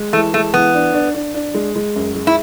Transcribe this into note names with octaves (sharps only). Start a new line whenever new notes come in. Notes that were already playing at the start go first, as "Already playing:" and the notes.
Already playing: G#3
E3 A3
G#3 A3
E3 B3
D4
D4
D4
D4
G#3
G#3
F#2
G#3
E4